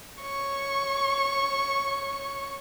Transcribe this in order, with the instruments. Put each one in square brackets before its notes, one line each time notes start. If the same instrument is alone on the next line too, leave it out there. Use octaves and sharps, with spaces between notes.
[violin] C#5 C#6